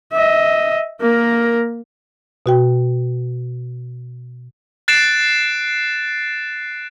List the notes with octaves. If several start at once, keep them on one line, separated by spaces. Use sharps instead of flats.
D#5 E5
A#3 A#4
B2 F#4 G5
F#6 A6 C7 D7 E7